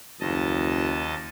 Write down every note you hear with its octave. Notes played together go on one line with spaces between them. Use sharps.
F#1 D#2 D#5 A5